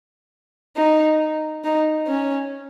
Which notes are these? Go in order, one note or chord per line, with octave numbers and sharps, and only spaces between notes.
D#4
D#4
C#4